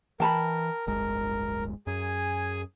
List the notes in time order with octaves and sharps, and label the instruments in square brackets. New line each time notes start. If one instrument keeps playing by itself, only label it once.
[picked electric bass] E3 [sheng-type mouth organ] A#4 [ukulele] G5 A5 B5
[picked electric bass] D1 G1 G#3 [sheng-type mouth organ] A#4
[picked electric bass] F#2 [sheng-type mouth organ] G#4 G#5